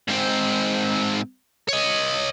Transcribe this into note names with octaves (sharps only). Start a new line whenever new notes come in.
G#2 C4
C#5 D#5